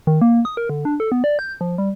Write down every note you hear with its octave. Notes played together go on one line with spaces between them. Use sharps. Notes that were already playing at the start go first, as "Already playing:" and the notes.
D#3
A#3
D#6
A#4
D3
D4
A4
B3
D5
G6
F3
G3